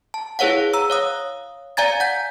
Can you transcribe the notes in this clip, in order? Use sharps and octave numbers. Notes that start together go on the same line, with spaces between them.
A5
E4 G#4 B4 C#5 F5 F#5
A#5 E6
C#5 F5 D#6
D5 F5 G#5 A#5 G#6 A6
F#5 G6